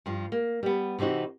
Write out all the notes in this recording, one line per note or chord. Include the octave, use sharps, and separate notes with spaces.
G2 F3
A#3
G3 B3
C3 E3 C4 D#4 F#4